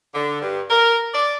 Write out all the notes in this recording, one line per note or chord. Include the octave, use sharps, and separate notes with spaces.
D3
G2
A#4
D5